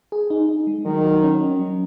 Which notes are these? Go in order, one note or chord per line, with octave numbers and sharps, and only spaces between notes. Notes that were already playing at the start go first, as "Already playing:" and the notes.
G#4
D#4
D#4
G#3
D#3 F#3
F#4
C#4
C#4
F#3